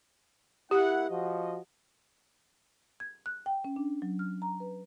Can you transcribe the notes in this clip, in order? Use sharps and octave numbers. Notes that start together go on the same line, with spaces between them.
A#3 E4 G4 F#5
F3 F#4 D#5
G#6
F#6
G5
C#4
D4
F#3
F6
A#5
B4